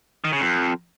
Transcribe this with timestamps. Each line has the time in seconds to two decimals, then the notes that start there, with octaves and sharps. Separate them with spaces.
0.25 D#3
0.33 C#3
0.41 F2